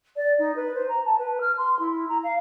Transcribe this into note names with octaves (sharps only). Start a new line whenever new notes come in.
D5
D#4
B4
C5
A#5
A5
B4
F6
C6
E4
A#5
F5